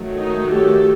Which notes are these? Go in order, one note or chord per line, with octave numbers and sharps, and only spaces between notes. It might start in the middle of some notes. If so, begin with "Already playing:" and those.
Already playing: D#3 F#3 A3
D#4
G4 A4